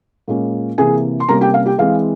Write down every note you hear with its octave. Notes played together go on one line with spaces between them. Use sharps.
A#2 G#3 C#4
C3 E3 A#3 G#4 G#5
C6
C3 G3 A#3 C#4 A#4 A#5
G4 G5
F5
G4 G5
E3 G#3 C4 F5